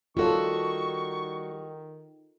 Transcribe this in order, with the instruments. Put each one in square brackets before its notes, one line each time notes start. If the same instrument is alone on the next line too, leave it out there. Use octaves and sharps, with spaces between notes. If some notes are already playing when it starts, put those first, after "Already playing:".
[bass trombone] D#3 [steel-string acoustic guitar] G3 F#4 C#5 [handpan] F4 A4 [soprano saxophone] C#6